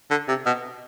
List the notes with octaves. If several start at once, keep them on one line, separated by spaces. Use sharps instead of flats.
D3
C3
B2